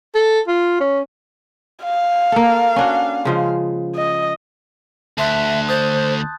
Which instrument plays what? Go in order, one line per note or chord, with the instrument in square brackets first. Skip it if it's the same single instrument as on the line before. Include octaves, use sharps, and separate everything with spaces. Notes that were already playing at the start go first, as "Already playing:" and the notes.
[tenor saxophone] A4
F4
C#4
[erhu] F5
[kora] A#3 A4
C#4 D4 F#4
C#3 F3 G#3
[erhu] D#5
[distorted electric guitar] D2 [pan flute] E5 [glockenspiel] A5 C6 F#6
[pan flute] C5 [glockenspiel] D#6 G6 A6